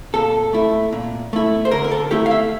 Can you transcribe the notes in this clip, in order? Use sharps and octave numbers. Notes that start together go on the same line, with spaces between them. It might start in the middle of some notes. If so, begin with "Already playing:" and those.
A#2 A4
A3 E4
A#2
A3 E4
C5
D3 A#4
A#4
A4
A3 E4 G4
F5
E5